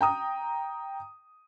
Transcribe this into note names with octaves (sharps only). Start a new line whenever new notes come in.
G5 A#5 D#6